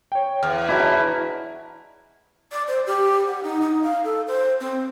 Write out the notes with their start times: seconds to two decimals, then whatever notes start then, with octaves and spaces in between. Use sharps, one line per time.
0.12 C#5 G5
0.43 E2 F#5 F6
0.69 F#3 G#3 D4 E4 D#5
2.52 D5
2.68 C5
2.87 G4
3.27 F#5
3.44 D#4
3.62 D#4
3.83 F5
4.04 A4
4.28 C5
4.60 C4